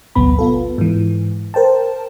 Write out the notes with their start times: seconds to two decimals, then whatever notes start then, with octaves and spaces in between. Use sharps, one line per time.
0.15 G#1 D2 B2 F#3 B3 B5
0.39 B3 F4 A4
0.78 G#2 E3
1.54 A#4 C5 G5 A5